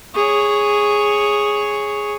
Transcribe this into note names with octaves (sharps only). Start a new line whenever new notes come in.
G#4 C#5